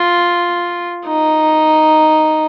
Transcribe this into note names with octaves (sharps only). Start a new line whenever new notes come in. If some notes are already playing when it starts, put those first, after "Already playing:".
Already playing: F4
D#4